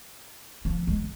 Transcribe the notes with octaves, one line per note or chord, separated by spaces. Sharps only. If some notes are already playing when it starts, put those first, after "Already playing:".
F3
G#3